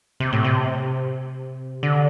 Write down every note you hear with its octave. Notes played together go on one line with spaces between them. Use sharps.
C3
A2
C3
D3